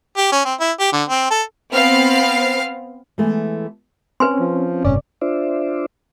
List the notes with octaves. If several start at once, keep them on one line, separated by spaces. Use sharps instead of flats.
G4
C#4
C4
E4
G4
D3
C4
A4
B3 C4 F5 F6 C7
E3 G#3 A3 B3
C4 C#4 B4 G#5 C6
F3
F#1 G#2 C3 C#4 D5
D4 F4 C5 D5 E5